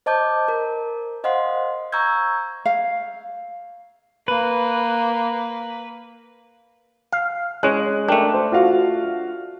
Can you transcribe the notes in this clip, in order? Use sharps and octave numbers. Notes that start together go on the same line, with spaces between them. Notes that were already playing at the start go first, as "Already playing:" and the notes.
C5 D#5 A5 D6 G6
A#4
C5 D#5 F5 F#5 C6
A#5 C#6 E6 G6 G#6
F5
A#3 B4
F5
G#3 C#4 C#5 F#6
A3 D4 A#4 G5
C5
F4 F#4 F5